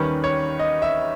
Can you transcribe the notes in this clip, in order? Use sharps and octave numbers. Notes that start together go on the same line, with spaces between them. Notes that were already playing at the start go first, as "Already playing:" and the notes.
Already playing: D#2 D#3 G3 C#4 B4
C#5
D#5
E5